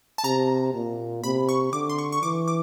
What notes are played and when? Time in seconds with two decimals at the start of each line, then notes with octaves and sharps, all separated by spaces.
0.18 A5
0.24 C3 A#5
0.74 A#2
1.24 C3 B5
1.49 C#6
1.73 D3 D6
1.89 C6
1.98 C#6
2.12 C#6
2.22 E3 D6
2.48 D6